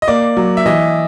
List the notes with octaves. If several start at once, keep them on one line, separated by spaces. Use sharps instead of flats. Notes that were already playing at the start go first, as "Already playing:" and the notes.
D#5
A#3 D5
F#3
E5
E3 D#5